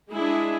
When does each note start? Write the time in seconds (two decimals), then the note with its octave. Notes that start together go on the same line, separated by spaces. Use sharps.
0.11 G#3 D4 E4 G#4